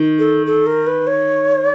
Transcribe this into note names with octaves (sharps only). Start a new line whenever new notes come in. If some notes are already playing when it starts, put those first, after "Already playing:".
Already playing: D#3
A4
A4
A#4
B4
C#5